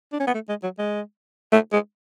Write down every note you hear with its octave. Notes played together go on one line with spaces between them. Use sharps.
D4
C#4
B3
A3
G#3
F#3
G#3
A3
G#3